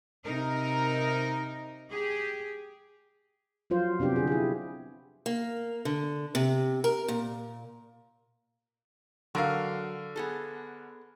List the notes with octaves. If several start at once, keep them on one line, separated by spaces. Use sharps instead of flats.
C3 D#4 A#4
G4 G#4
F3 F#3 F4 C5
C3 B3 D4 G4
D3 G#4
E4 G#4
A#3
D3
C3
A#4
A#2
D3 F#3 A#4 F5
B3 G#4 A4